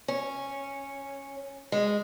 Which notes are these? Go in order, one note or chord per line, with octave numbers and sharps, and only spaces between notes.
C#4
G#3